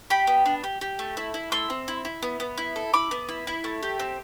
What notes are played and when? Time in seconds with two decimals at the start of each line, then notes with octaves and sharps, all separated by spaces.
0.10 G4 G5 B5
0.27 B3
0.46 D4
0.64 G4
0.81 G4
0.99 A3
1.17 E4
1.34 E4
1.52 A3 C6 E6
1.70 C4
1.88 E4
2.05 E4
2.23 B3
2.40 B3
2.58 E4
2.76 A4
2.94 E4 B5 D6
3.11 B3
3.29 E4
3.47 E4
3.64 A3
3.83 G4
3.99 C4